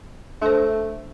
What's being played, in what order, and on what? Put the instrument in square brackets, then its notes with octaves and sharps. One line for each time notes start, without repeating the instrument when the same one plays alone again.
[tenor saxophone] A3 [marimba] D4 A4 C5